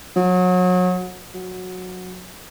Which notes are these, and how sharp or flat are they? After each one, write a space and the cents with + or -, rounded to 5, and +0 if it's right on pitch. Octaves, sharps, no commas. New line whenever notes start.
F#3 -30
F#3 -15